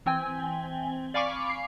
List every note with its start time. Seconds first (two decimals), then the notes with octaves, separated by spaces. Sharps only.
0.06 E3 C4 G5 G#5
1.14 D5 F5 G#5 B5 C#6 D6
1.49 C7